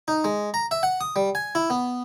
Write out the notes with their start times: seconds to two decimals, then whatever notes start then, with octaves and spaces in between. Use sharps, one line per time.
0.08 D#4
0.24 G#3
0.54 A#5
0.71 E5
0.83 F#5
1.01 D#6
1.16 G3
1.35 G#5
1.55 E4
1.70 B3